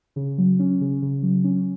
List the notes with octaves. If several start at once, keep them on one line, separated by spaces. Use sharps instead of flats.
C#3
F#3
C#4
C#3
C#3
F#3
C#4